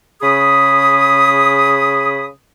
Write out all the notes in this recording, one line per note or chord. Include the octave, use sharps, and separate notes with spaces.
C#3 G#4 B5 D#6